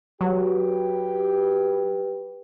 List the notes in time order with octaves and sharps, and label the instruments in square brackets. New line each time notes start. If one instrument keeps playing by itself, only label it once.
[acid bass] F#3 [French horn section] G4 B4